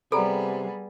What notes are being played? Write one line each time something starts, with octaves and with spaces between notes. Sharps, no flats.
C3 G3 B3 G#4 A4 D5 A#5 B5